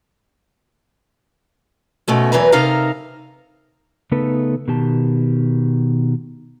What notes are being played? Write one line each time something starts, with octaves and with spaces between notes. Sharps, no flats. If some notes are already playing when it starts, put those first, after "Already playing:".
G#2 B2 A3 C#4
E2 C3 E3 F#3 A#4 B4
C3 D#4 A4 A#4 F5 A#5
C#3 A3 B3 D#4 A4 B4
B2 D#3 G4 A5